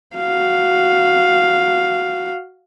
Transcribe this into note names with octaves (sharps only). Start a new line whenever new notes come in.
F#4 F5